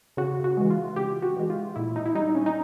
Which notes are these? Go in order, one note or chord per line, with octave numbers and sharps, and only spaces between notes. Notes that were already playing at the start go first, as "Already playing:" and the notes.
C#3 F#4
F#4
E3 G#3
F4
C#3 G4
F#4
E3 G#3
F4
A#2 E4
D#4
E4
G3 D#4
C#4
D#4